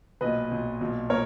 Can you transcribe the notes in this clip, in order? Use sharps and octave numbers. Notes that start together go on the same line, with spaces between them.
B1 A#2 B4 D#5
B1 A#2
B1 A#2
A#2 A#4 C#5